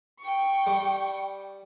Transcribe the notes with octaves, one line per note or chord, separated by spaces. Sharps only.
G5 C#6
G3